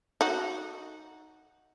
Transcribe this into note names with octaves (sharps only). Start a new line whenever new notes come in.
D#4 F#4